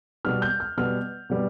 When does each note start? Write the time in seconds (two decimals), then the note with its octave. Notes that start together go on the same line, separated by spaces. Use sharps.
0.25 B2 G3 B3 F6
0.42 G6
0.60 F6
0.77 B2 G3 B3 F6
1.30 B2 G3 B3